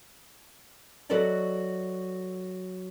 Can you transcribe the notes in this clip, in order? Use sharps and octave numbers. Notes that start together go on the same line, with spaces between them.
F#3 F#4 A4 B4 D5 D#5